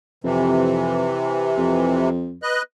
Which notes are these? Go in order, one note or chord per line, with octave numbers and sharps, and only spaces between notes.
F2 C3 E3
F2
B4 D#5 F#6